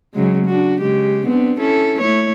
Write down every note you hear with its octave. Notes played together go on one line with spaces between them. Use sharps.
C#3 F#3 G#3
D4 F#4
C#3 G#3 G4
B3 C4 D4
C#4 E4 A4
A3 E4 C#5